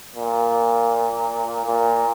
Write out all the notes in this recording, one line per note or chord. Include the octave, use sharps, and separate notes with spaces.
A#2
A#2